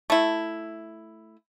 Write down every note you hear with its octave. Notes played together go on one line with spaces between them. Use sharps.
A3 E4